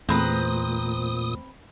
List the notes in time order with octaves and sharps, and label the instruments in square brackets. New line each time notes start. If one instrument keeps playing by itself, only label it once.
[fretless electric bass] E2 [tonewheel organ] A#2 D#6 [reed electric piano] A3 [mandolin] C4 B4 A#5